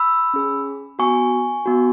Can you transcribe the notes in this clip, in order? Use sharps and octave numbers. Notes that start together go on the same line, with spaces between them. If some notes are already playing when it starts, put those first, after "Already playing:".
Already playing: B5 E6
C#4 G#4
B3 F#4 G#5 C#6
B3 F#4